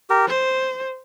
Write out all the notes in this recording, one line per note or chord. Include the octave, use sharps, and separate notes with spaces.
G4 A#4
C5